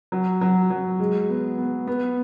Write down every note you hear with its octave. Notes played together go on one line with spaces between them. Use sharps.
F#3
F#3
F#3
G#3
B3
B3
B3